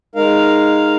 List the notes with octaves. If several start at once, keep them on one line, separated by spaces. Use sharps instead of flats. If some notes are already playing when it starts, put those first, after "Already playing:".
G#3 D#4 A#4 F5